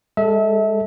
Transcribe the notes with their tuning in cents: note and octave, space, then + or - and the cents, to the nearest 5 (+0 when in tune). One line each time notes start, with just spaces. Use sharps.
G#3 -30 A4 +0 E5 -30